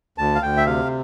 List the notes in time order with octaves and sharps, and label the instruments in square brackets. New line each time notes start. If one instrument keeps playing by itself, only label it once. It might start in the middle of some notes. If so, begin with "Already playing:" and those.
[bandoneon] D2 A5
F5
D2 G5
E5
C3 F5